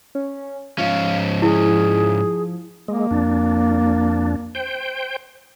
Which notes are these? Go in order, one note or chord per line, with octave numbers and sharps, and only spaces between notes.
C#4
G#2 F3 C#4 F5
E4 G#4
G#3 A#3
F2 D4
C5 G5